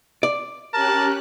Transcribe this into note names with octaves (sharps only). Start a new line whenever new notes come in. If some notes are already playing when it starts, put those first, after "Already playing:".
D5
C#4 G4 A#4 A5 F#6